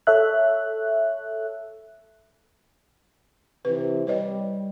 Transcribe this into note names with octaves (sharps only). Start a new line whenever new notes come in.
A4 C#5 E5 F#6
C3 E3 B4
G3 B4 C#5 D#5